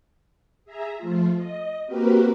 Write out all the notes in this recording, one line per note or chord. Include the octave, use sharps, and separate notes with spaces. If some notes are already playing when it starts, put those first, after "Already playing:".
G#4 E5 A#5
F3 A3 F4
D#5
A#3 C4 F#4 G4 A#4 B4